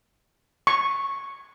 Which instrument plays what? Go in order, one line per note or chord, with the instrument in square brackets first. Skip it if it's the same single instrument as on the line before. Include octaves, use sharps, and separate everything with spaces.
[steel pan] C#6